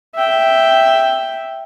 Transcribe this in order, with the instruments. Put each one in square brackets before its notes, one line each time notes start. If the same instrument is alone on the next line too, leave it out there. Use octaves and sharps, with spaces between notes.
[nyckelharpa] E5 G5